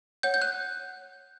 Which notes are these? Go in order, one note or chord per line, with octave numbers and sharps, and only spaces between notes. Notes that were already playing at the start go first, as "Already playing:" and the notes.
C#5 F#5 G6
G6
F#6